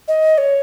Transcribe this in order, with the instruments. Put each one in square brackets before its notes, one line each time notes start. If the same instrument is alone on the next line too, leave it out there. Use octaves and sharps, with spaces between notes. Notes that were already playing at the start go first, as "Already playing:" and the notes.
[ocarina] D#5
C#5